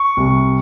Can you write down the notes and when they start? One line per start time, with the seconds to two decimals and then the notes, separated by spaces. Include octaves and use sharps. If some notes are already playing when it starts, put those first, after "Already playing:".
Already playing: C#6
0.17 C2